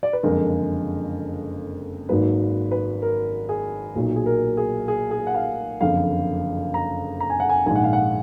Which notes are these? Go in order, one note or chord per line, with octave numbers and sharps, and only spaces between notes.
D5
B4
F#1 F2 D3 G#3 A#4
G#1 G#2 F#3 A#3 B4
B4
A#4
G#4
B1 A#2 F#3
G#4
A#4
G#4
G#4
G#4
F#5
F5
F#1 F2 D3 F5
A#5
A#5
G#5
F#5
G#5
A#1 G#2 D#3 G#3 G#5
F#5
F5
F#5